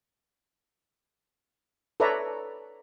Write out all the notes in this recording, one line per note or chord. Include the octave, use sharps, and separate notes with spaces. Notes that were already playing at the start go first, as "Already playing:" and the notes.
A4 B4 C#5 D5 E5 A#5